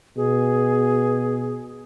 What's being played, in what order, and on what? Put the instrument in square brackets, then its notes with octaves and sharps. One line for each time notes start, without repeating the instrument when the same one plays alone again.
[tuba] B2 [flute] G#4